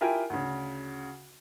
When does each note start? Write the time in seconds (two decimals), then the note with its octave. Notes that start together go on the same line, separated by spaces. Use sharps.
0.01 E4 F4 G4 A#4 G5 G#5
0.30 D2 C#3